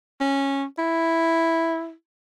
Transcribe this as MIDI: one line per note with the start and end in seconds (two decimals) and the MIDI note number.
0.20 0.64 61
0.78 1.92 64